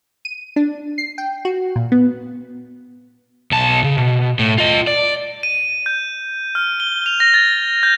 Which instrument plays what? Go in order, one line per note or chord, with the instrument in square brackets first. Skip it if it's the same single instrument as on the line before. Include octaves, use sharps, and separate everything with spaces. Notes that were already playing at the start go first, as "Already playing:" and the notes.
[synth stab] D#7
D4
C7
G5
F#4
A#2
B3
[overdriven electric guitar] B1 A5
C#3
B2
A2
F4 D#5
D5
[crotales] D#7
G6
F6
G7
F7
A#6
A6
G6